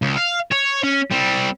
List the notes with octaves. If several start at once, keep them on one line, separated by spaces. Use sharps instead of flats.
C#2
F5
C#5
C#4
G3 C4